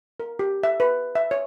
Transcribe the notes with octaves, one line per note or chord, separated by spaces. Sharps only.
A#4
G4
E5
B4
E5
C#5